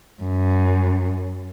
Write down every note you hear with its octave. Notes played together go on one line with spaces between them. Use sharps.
F#2